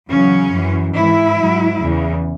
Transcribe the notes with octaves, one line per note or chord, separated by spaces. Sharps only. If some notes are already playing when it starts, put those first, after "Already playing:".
E2 C#3 F#3 C#4
F#2 E3
G#2 E3 E4
G#2 F#3
E2 C#3 E3